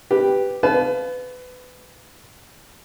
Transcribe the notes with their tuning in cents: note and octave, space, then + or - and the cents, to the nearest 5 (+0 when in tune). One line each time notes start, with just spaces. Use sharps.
G4 +0 B4 +0
B4 +25 F5 +5 A5 -30